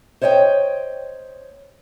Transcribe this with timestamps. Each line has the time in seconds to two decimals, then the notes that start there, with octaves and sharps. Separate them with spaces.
0.21 C5 C#5 D#5 F5 G5